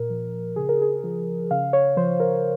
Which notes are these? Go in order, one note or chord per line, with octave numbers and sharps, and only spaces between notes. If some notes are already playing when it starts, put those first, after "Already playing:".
Already playing: A#2 A#4
F3
C#3 G#4
A#4
G#4
F3
C#3 F5
C#5
F3 C5
A#4